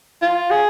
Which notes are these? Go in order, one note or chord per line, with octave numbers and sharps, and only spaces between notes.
F4
G#4